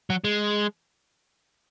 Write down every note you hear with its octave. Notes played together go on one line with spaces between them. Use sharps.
F#3
G#3